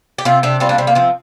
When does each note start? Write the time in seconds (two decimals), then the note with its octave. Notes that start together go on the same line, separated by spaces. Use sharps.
0.18 G4
0.25 C3 C4 F4
0.43 C3 D4 G4
0.60 G3 C4 F4
0.69 A#3 D4
0.78 C3 C4
0.87 A#3
0.95 F3 C4